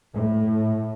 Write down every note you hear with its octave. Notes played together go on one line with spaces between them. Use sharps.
A2